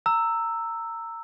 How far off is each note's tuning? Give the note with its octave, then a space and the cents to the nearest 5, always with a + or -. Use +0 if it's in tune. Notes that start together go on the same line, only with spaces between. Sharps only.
A#5 -20 E6 +0